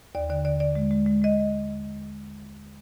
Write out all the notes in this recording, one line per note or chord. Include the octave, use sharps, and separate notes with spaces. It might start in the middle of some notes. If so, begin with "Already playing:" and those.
D#2 D5
D3 D5
D3 D5
D3 D5
G#3
G#3
G#3
G#3 D#5